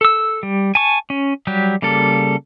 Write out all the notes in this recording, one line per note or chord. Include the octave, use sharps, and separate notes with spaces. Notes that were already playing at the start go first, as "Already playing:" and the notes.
A4 E6
G3
G#5 A5 C#6
C#4
F#3 G3 G4
C#3 G3 A#3 A4